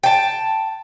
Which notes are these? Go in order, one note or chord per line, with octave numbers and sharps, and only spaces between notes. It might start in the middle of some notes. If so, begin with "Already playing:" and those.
G5 A5